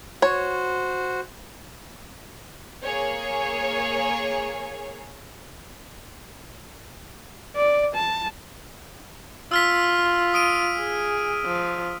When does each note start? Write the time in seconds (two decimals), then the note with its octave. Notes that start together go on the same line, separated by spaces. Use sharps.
0.22 F#4 C5 C#5
2.84 A#3 G#4 C#5
7.56 D5
7.95 A5
9.51 F4 E6 F6 B6
10.34 D#6 D7 D#7
10.77 G#4
11.45 F3